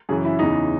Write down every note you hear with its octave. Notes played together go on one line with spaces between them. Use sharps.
F#2 C#3 E3 G#4
E4
E2 C#3 E3 D#4